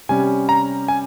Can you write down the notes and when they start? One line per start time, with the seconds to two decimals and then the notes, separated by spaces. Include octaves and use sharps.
0.09 C3 G3 C#4 G#5
0.49 A#5
0.88 G#5